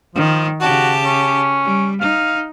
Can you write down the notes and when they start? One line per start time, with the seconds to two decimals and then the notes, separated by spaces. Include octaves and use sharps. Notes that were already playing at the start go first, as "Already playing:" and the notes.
0.15 D#3 F3
0.61 C#3 F#4 G4 A5
1.05 C#4
1.64 G3
2.01 D#4 F5